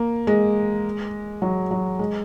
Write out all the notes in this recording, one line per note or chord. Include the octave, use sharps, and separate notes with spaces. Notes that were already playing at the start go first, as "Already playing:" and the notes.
Already playing: A#3
G#3
F#3
F#3
G#3